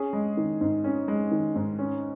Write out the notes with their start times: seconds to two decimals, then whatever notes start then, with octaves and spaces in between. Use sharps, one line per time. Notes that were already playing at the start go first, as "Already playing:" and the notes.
Already playing: C#4 G#4
0.13 G#3
0.37 D#3
0.61 G#2
0.84 C#4
1.08 G#3
1.31 D#3
1.55 G#2
1.79 C#4